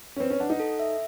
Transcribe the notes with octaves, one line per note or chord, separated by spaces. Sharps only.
C#4
C4 B4
C#4
D4 F#5
D#4
A4
E5